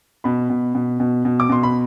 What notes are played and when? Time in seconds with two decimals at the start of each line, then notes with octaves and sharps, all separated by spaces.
0.24 B2 B5
0.50 B2
0.75 B2
1.00 B2
1.25 B2
1.40 D6
1.49 B2 C6
1.63 B5